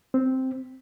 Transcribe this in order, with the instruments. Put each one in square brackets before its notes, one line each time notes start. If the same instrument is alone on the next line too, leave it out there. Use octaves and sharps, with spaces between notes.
[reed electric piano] C4